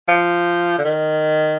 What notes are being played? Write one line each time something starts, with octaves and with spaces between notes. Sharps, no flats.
F3
D3
D#3